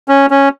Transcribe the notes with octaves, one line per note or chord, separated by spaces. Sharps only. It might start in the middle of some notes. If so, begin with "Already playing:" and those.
C#4
C#4